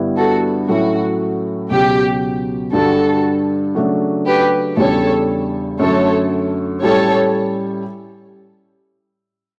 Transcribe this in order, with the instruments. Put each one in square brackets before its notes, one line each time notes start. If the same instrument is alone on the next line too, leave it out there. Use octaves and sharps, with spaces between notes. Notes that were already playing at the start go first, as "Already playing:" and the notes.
Already playing: [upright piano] G2 D3 G3 B3 E4
[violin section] F#4 A4
[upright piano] A2 F#3 A3 C#4 E4 [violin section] F#4
[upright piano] C#2 B2 F#3 [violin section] G4
[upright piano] G2 D3 G3 [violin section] F#4 A4
[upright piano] C#3 F#3 A3 D4 F#4
[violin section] G4 B4
[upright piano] E2 C#3 G3 D4 [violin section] A4 C#5
[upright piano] F#2 D3 F#3 A3 [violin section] A4 C#5
[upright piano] A2 G3 C#4 G4 [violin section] A4 C#5